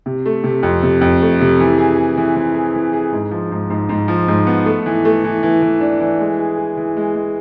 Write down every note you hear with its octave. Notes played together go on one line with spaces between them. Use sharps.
C3
A3
C3
F2
C3
F2
A3
C3
E3
G#4
G#4
E3
E3
G#4
E3
G#4
G#2
F3
G#2
G#2
G#2
F3
G#2
B3
A3
E3
A3
E3
E3
E3
D4
E3
G#3
G#4
G#4
E3
G#3
G#3